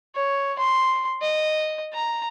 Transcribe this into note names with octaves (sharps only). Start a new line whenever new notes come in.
C#5
C6
D#5
A#5